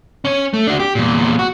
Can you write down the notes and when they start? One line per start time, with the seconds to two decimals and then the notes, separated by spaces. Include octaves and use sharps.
0.25 C#4 C#5
0.54 A3
0.67 D4 F#4
0.80 G4
0.95 E2 A#2
1.39 F#4